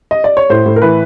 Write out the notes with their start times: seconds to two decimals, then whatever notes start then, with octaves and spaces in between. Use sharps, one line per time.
0.11 D#5
0.24 D5
0.37 C#5
0.50 A2 C5
0.66 A2
0.76 A#4
0.82 E3 B4